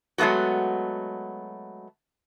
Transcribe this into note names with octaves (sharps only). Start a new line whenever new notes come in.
F#3 G#3 A3 B3 F#4